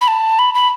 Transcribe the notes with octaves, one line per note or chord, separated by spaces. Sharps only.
B5
A5
B5
B5